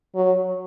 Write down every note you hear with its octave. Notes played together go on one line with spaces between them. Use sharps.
F#3